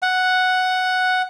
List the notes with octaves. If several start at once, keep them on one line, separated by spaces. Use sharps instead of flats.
F#5